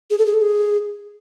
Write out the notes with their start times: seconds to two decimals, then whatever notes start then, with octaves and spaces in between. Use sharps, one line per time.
0.10 G#4
0.18 A4
0.26 G#4
0.34 A4
0.42 G#4